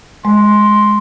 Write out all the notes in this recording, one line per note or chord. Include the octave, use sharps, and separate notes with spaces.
G#3 C6